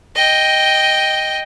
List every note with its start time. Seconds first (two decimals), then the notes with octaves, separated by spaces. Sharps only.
0.16 D#5 G5